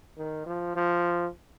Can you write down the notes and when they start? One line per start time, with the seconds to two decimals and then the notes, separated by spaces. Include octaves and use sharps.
0.18 D#3
0.46 F3
0.76 F3